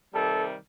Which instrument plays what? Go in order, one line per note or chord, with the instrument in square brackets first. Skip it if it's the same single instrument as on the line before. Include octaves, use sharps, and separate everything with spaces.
[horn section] C3 D#3 G3 A4